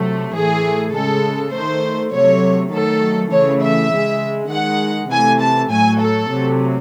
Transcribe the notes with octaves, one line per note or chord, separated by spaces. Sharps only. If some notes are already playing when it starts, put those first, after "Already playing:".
Already playing: C3 F#3 A3
A2 E3 A3 G#4
C#3 G#3 A4
D#3 A3 C5
C3 F#3 A3 C#5
D#3 F#3 A3 A4
C#3 E3 A3 C#5
E5
C#3 G#3
D#3 G#3 F#5
C3 E3 A3 G#5
A5
A2 F#3 A3 G#5
A4
C3 F#3 A3